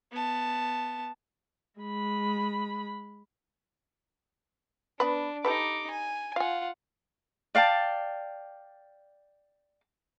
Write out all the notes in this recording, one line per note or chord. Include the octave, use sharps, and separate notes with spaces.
B3 A5
G#3 B5
B3 D4 B4
D#4 G4 A4 B4 D6
G#5
F4 F5 F#5 G#5
D5 F5 G5 A5